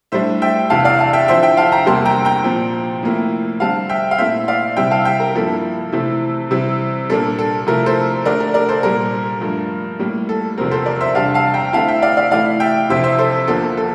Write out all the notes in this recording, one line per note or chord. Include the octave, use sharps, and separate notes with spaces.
A2 G3 D4 C5 E5
E5 G5
E2 C3 E3 F5 A5
D5 F5
F5 A5
E5 G5
D3 F3 C4 E4 C5 E5
E5 G5
F5 A5
G5 A#5
E2 C3 G3 A#3 A5 C6
G5 A#5
G5 A#5
A#2 F3 C4
A2 F3 A#3 E4
D3 G3 C4 F5 A5
E5 G5
F5
A#2 A3 C4 E4 C5 E5
D5 F5
C3 G3 C4 E4 E5 G5
F5 A5
E5 G5
A#4
G2 F3 A#3 E4 A4
C3 E3 A3 C4 E4
C3 E3 G3 C4 E4
A#2 G3 A#3 D4 A4
A4
C3 F3 A3 E4 A#4
A4 C5
D3 A3 D4 A#4 D5
A#4
A#4 D5
A4 C5
A#2 G3 A#3 A#4
G2 F3 A3
A2 G3 A#3
A4
E2 C3 F3 C4 A#4
A4 C5
A#4 D5
C5 E5
E2 C3 G3 D4 F5 A5
F5 A5
G5 A#5
D3 A3 C4 E4 F5 A5
E5 G5
D5 F5
D5 F5
A2 E3 A3 E4 D5 F5
E5 G5
F2 C3 E3 C5 E5
C5 E5
A4 C5
E2 D3 F3 A#3 A4
A4